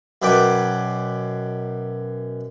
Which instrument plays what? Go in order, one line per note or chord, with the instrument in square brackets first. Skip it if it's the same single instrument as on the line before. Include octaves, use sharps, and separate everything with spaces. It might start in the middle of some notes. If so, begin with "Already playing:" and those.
[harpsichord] F#2 B2 B4 D5 G5 D6